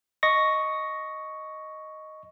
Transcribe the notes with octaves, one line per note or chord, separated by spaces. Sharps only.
D#5 C#6 A#6